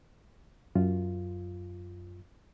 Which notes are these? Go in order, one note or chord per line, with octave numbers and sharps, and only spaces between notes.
F#2 F4